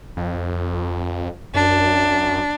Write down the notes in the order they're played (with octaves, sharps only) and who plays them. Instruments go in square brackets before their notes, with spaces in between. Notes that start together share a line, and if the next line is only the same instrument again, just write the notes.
[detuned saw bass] F2
[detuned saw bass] F#2 [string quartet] D4